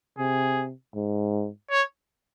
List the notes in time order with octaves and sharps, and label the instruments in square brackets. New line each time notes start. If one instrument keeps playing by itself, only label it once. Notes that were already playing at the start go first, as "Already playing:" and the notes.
[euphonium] C3 [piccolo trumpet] G#4
[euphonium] G#2
[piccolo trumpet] C#5